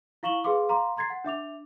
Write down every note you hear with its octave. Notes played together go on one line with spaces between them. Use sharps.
E4 F5 C#6 E7 F#7 G7
G#4 B4 F5 C6 D6
F5 A#5 C6 D6
A#5 C6 G#6 A6 C7
F#5
D4 E5 D6 F7